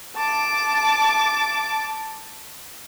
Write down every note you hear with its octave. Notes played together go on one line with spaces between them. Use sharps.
A5 D6